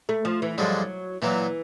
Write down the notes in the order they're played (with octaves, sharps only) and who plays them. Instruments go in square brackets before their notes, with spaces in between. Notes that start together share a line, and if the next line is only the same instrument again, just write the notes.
[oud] A3
F3
E3
[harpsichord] G2 D3 F3 G#3 [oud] F#3
[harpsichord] A#2 F#3 A#3 [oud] E3